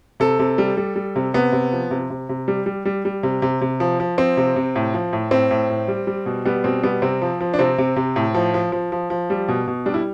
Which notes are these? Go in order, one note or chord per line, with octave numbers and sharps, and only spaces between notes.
C3 A4
C3
G3
G3
G3
C3
C3 B3
C3
F3
C3
C3
C3
G3
G3
G3
G3
C3
C3
C3
F3
F3
F3 C4
C3
C3
A2
F3
A2
A2 C4
A2
A2
G3
G3
B2
G3 B3
B2 C4
G3 B3
C3 C4
F3
F3
D4
C3 C4
C3
C3
A2
F3
F3
F3
F3
F3
G3
B2
B2
G3 D4
E4